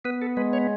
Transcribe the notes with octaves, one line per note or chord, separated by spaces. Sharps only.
B3 B4
A4
G#3 B4
C#5